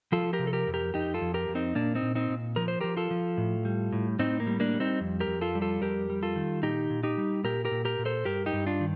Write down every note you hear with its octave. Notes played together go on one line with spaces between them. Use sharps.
F3 F4 A4
G4 A#4
C3
A4
G4 A#4
F2
G4 A#4
F2 D#4 G4
F4 A4
F2
G4 A#4
F2
C4 D#4
A#2 A#3 D4
C4 D#4
A#2
C4 D#4
A#2
F3 A#4
C5
F3 G4 A#4
F4 A4
F3
A2
G3
A2
A2 C4 D#4
A#3
G3
A#3 D4
G3
C4 D#4
F2
G4 A#4
F2
F4 A4
G3
F4 A4
F2 G4 A#4
G3
F4 A4
D#3
A#2 D#4 G4
A#2
D#4 G4
G3
A#2 G4 A#4
G4 A#4
A#2
G4 A#4
A#2
A4 C5
G2 G4 A#4
D#4 G4
G2
D4 F4
D#3